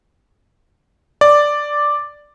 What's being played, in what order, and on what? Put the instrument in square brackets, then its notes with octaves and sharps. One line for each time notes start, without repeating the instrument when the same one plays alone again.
[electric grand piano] D5